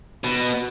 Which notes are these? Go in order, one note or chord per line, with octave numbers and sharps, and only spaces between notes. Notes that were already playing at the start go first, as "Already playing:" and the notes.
B2